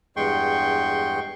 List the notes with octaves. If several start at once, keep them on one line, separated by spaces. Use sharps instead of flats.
E2 G2 G#3 G5 C6 C#6